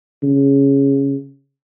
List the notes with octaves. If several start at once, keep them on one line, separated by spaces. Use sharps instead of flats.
C#3